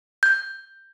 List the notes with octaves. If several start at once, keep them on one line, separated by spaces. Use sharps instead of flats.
G6